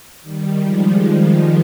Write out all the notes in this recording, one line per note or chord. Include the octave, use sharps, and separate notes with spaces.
D#3 G3
F3 G#3